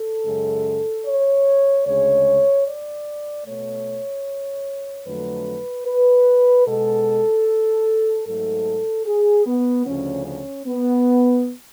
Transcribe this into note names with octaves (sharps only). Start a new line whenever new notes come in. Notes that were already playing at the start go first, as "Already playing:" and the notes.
Already playing: A4
F#2 C#3 G#3
C#5
D2 C#3 G#3 C#5
D5
B2 A3 C#5
F2 D3 F#3 A3 B4
B4
B2 G#3 A4
G#2 F#3 A3 A4
G#4
B3
D2 C#3 F3 C#4
C#4
B3